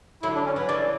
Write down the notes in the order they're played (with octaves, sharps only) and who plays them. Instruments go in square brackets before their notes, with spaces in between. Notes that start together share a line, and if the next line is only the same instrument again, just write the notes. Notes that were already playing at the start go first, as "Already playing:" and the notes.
[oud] D3 F#3 [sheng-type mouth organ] E4
[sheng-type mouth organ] D4
C#4
[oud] F#3 [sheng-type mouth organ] B4
[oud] C#3 E3 [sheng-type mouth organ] D5